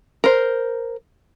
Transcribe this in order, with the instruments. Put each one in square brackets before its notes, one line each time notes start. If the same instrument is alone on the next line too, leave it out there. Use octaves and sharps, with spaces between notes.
[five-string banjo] A#4 C5